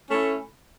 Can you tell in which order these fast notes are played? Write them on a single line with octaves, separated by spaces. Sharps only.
C#4 A3 E4